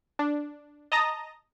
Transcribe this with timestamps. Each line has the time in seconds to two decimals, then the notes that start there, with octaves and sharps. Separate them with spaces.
0.19 D4
0.92 D#5 A5 A#5 D#6 A#6